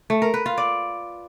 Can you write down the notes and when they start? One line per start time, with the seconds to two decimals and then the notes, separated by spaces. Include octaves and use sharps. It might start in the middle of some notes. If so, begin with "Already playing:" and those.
0.10 A3
0.22 A#4
0.34 B4
0.46 F4
0.58 D5